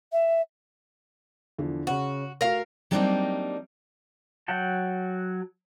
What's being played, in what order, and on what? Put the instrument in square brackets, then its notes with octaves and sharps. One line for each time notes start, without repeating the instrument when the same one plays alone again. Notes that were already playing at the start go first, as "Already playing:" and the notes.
[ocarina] E5
[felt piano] E2 D3 F3
[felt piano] C#3 C#4 [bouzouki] F#4
[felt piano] A3 F#4 [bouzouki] A#4 F5
[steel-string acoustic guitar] F#3 G3 A#3 C4 D4 D#4
[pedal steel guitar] F#3 F#5 G5 A5